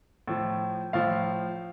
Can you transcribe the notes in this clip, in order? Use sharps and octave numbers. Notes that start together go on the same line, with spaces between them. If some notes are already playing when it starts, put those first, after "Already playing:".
A2 F3
A2 F3 F5